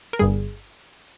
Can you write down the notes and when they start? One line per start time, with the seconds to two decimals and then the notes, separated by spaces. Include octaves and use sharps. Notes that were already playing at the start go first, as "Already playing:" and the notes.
0.13 A#4
0.19 G1 G2 G3 G#4